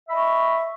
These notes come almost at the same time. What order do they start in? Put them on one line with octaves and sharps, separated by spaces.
E5 B5 D#5 C#6